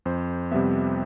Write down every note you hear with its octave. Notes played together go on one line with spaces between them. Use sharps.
F2 C5
C3 G3 B3 E5